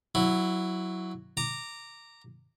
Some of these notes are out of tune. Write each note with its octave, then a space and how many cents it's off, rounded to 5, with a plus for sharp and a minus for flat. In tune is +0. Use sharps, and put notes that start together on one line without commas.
F#3 +0 E4 +0
A#5 -15 D6 +0